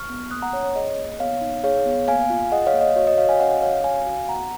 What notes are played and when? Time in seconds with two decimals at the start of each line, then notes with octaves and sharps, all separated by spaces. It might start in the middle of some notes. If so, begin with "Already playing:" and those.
Already playing: C#6 F6
0.10 B3
0.31 A#3 D#6 F#6
0.42 F#5 A#5
0.53 C#4 C#5
0.64 C#5
0.75 G#4 D#5
0.97 A#3
1.20 B3 C#5 F5
1.41 D#4
1.64 G#4 C#5 F5
1.86 B3
2.08 A#3 F5 G#5
2.30 F4
2.52 G#4 D#5 F#5
2.66 C#5 F5
2.74 A#3
2.81 D#5
2.96 F#4 C#5
3.07 D#5
3.18 F#4 C#5 F5
3.29 F5 G#5
3.40 C#4 D#5 F#5
3.62 C#4 C#5 F5
3.84 F#4 F5 G#5
4.06 F#4
4.28 B3 F#5 A#5